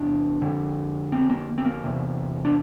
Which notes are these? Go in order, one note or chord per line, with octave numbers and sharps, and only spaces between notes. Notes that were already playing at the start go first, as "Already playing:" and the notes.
Already playing: E2 C3 D4
F2 D3
C4
A#3
C4
A#3
E2 C3
D4